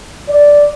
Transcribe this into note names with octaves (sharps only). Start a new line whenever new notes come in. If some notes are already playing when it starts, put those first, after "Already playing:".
D5